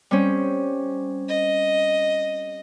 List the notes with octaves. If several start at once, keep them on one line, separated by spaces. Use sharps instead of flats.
G3 C4 C#4
D#5